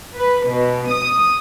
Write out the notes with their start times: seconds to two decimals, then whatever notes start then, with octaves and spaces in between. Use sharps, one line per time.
0.16 B4
0.50 B2
0.91 D#6